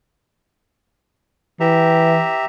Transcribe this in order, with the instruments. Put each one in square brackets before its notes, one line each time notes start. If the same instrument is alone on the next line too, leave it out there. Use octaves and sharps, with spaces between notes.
[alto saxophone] E3 [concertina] G4 E5 A#5